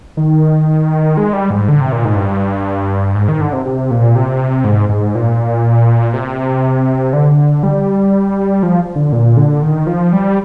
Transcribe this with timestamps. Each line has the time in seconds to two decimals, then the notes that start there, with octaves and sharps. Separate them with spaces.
0.17 D#3
1.17 G#3
1.33 G3
1.50 G#2
1.69 D3
1.81 C3
1.92 A#2
2.05 G#2
2.16 G2
3.15 G#2
3.28 D#3
3.41 D3
3.53 C3
3.66 C3
3.91 A#2
4.16 C3
4.64 G#2
4.89 G#2
5.15 A#2
6.14 C3
7.13 D3
7.63 G3
8.63 F3
8.96 D3
9.12 A#2
9.37 D3
9.62 D#3
9.87 F3
10.13 G3